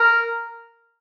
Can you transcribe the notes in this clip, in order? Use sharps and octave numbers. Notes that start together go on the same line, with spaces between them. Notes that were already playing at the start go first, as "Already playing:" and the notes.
Already playing: A#4